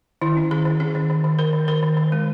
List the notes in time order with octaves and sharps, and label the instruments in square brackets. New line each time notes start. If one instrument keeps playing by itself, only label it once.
[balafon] D#3 E4
C#4
D#3 G#4
D#3
C#4 G#4
D#3
D#3
D#3
D#3 A#4
D#3
D#3 A#4
D#3
D#3
G#3